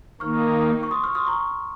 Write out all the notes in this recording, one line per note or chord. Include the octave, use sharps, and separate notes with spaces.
D#3 A#3 D#4 C#6 F6
C#6
C6 D#6
C#6 F6
C6 D#6
A#5 C#6